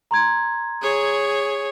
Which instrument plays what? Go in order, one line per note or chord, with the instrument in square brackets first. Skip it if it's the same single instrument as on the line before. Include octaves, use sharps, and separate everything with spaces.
[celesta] A#5 C6 G#6
[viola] G#4 C#5